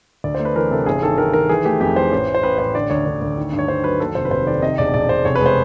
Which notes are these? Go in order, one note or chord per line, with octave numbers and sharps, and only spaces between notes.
D2 D5
A3 C5
B4
E3 A#4
C3 A4
G1 G#4
D#3 A4
D#3 A#4
D#3 A#4
E3 G#4
A3 G4
F2 G4
E3 C5
A1
A1
C5
A1 B4
A1 C5
D3 D5
D2 C#5
D2
D2
D#3
G2
C#5
G2 C5
F#3 B4
D#2 A4
F1 C5
B4
F1 C5
D#3 D5
C3 D#5
E1 D5
E1 D5
E1 C5
F1 C#5
B4
G#3 C5